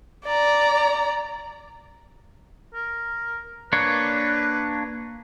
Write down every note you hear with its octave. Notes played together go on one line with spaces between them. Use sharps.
D5 A#5
A#4
A#3 D4 B4 C#5